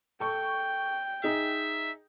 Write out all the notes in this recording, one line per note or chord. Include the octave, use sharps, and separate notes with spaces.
A4 G5 C#6
D#4 G#4 E5